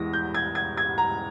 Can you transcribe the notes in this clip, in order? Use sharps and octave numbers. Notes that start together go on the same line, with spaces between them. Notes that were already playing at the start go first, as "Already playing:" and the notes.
Already playing: E2 E3 G#3 A#6
G6
G#6
G#6
G#6
A#5